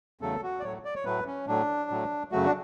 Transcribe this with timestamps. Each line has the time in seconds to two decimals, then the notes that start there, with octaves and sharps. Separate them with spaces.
0.21 E2 C#3 F#3 A3 A4
0.43 F#4
0.60 D5
0.63 A2 F#3 A3 C#5
0.85 D5
0.95 C#5
1.05 A2 F#3 A3 B4
1.27 C#4
1.47 A2 F#3 A3 D4
1.90 A2 F#3 A3
2.31 F#2 C#3 F#3 A3 F#4
2.46 D4